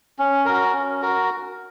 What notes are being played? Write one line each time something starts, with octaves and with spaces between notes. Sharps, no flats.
C#4
F#4 A#4
C#4
F#4 A#4